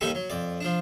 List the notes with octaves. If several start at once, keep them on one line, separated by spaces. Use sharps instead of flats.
D#2 D#3 G3 A4 B5 C#6
F#3
F2 D5
F3 D4